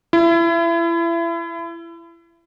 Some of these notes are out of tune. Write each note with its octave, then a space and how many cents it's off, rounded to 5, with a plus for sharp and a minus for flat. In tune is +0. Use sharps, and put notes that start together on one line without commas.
E4 +30